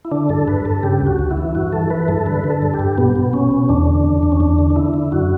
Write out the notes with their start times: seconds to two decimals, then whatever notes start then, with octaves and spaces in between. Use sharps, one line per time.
0.05 E4
0.11 D3 D4
0.29 G2 A4
0.48 G2 B4
0.65 G2 A4
0.83 C#3 G4
1.01 D2
1.07 F#4
1.19 D2
1.31 E4
1.37 E3
1.55 G2 F#4
1.72 E3 A4
1.90 E3 B4
2.08 G2 A4
2.26 D3 B4
2.44 D3
2.50 A4
2.62 G2
2.74 G4
2.79 G2
2.98 B2 B3
3.16 B2
3.33 B2 C#4
3.51 B2
3.69 E2 D4
3.87 D3
4.05 E2
4.23 E2
4.32 C#4
4.40 E2 D4
4.59 D3
4.70 D4
4.76 D3 E4
4.94 D3
5.12 F#2 F#4